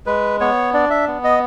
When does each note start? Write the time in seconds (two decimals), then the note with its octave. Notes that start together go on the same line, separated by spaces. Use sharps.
0.06 G#3 B4
0.40 B3 C#5
0.73 D4 D5
0.90 E5
1.07 B3
1.24 D#5